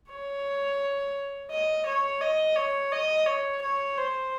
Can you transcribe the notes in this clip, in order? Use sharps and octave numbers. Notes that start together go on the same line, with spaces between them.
C#5
D#5
C#5
D#5
C#5
D#5
C#5
C#5
C5